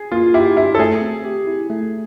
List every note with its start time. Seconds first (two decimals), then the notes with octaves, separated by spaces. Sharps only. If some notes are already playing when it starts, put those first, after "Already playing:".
Already playing: G#4
0.12 A#3 F4
0.34 E4 G4
0.56 D4 E4
0.75 A4
0.79 A3 G#4
1.01 C4
1.25 G4
1.47 E4
1.70 A3